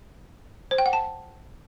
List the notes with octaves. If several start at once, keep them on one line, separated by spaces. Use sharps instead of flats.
C5
G5
F#5
A5